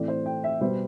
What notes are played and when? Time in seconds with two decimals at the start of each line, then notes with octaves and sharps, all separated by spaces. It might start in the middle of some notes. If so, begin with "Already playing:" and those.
Already playing: A2 E3 A3 C4 D5
0.08 C5
0.26 G5
0.44 E5
0.61 B2 G3 B3 C5